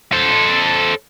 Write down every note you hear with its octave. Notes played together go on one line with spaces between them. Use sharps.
A4 C5